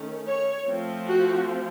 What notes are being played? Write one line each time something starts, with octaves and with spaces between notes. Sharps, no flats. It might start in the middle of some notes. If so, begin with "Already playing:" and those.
Already playing: D#3 A3 C#4
C#5
F3 A3 C4
F#4